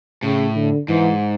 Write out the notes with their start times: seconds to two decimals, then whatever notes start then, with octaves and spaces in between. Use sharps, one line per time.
0.23 A2 C#3
0.56 D3
0.88 G#2 E3